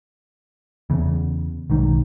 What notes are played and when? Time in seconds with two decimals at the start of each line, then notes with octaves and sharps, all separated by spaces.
0.90 E2 C#3
1.70 B1 G#2 D#3